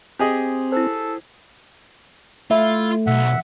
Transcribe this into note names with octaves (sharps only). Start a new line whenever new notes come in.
C4 G4 G#4 D#5
E4 A4 C5
A3 E4 F4 E5
B1 E5 F#5